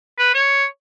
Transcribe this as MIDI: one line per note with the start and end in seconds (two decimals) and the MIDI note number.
0.19 0.34 71
0.34 0.65 73